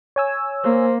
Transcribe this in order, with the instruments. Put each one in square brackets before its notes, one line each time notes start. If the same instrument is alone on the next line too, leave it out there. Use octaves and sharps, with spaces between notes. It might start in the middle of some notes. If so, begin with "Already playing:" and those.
[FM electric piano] C#5 G#5 E6
[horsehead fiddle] A#3 [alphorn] C5